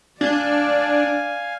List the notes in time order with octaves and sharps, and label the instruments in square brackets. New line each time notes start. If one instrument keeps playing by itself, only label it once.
[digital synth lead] D4 [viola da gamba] D5 [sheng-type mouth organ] F5 G#5